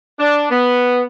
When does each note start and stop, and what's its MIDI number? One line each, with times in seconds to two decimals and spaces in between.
0.19 0.46 62
0.51 1.02 59